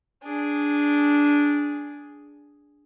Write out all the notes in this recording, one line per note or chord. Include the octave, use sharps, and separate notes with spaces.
D4 G#4